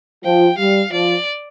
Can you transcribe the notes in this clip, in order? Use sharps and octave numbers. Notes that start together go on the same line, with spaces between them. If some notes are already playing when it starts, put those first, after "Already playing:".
F3 G5
G3 F5
F3 D5